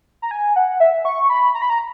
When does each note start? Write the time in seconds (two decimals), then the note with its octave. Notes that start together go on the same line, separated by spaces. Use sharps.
0.22 A#5
0.31 G#5
0.56 F#5
0.80 E5
1.05 C#6
1.30 B5
1.54 A#5
1.62 B5
1.70 A#5